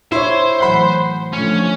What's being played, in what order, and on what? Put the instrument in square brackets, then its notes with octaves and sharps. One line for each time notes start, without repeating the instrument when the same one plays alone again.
[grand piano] E4 C#5 [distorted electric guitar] C5
[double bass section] A2 E3 F#3 [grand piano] F#5 B5
[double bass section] D3 F3 A3 [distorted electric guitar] C#4